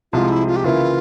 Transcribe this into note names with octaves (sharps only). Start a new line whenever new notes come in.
C2 C3 F3 G#3 F4
E4
F4
G4
C#3 E3 A#3 E4 F4